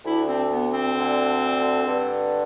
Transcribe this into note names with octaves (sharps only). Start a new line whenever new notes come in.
D2 D3 E4
C4
B3
C4
D2 D3
G2 D3